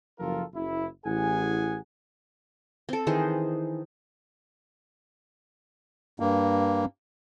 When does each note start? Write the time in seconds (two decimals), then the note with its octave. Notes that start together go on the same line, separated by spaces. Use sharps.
0.19 F#1 F3 F4 A4 A#4
0.53 F#1 E4
1.05 A1 E4 G#4 F#5 G#5
2.89 C4 A4
3.07 D#3 E3 G#4 C5
6.20 G2 A#3